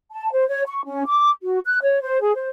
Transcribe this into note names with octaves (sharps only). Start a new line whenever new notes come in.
A5
C5
C#5
C#6
C#4
D6
F#4
F#6
C#5
C5
G#4
C5